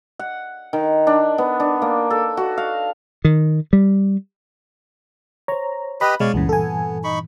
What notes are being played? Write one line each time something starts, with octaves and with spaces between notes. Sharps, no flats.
F#5
D#3
D4
B3
D4
A#3
A4
F#4
F5
D#3
G3
C5 C#5 A#5
G4 B4 D#5 B5
B2 G#3 C#5 D5 F5
C#2 G2 A#2 C#3 E3 B3
A4 G#5
D#4 B5 C#6